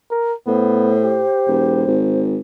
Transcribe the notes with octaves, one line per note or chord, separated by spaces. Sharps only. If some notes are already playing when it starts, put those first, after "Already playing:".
A#4
A2 B3 C5
G4
E1
G#1